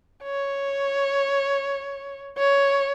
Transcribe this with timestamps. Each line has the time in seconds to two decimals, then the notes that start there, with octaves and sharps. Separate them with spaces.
0.23 C#5
2.38 C#5